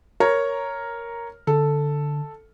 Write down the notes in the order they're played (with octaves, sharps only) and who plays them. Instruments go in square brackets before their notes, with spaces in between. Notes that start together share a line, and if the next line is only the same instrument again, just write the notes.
[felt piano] A#4 C#5 A#5
[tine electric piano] D3 [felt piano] A4